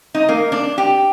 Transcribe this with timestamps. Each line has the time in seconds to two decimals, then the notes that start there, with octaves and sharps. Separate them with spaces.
0.15 D#4
0.29 A#3
0.52 D4
0.78 G4